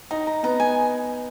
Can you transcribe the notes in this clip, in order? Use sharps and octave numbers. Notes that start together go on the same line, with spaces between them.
D#4 A#5
A#5
B3 A#5
G#5